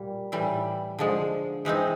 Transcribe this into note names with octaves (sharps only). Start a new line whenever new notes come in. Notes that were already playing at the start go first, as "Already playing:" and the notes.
Already playing: A#2 G3 A#3
A2 E3 G3
D3 F3 G#3
E3 G#3 C4 D#4